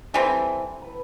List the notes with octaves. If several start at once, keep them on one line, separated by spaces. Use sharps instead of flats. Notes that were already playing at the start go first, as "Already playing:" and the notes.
E3 G3 C4 A4
B4